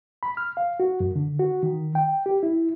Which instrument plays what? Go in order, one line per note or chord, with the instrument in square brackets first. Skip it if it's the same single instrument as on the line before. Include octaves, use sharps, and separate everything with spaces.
[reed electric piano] B5
F6
F5
F#4
F#2
D3
F#4
D#3
G5
G4
E4